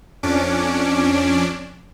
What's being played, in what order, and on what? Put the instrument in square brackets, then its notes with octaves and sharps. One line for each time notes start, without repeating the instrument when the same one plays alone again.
[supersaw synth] F2 C#4 D4 D6